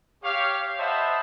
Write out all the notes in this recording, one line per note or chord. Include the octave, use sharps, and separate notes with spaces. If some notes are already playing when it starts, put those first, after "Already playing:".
G4 C#5 F5
C5 D#5 E5 F#5 A5 B5